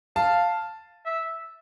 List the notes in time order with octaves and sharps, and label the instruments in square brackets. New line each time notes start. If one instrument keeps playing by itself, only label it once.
[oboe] F5 [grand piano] A5
[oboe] E5